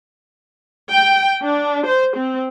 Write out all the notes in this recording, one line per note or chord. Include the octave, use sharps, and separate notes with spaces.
G5
D4
C5
C4